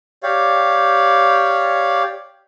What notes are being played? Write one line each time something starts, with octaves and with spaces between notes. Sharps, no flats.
G4 C#5 D5 F5